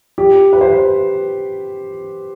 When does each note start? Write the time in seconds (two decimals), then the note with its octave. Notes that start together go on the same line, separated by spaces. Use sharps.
0.18 G4
0.53 B4
0.61 C5
0.70 B4